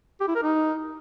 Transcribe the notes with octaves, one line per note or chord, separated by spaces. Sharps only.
G4
E4
A#4
D#4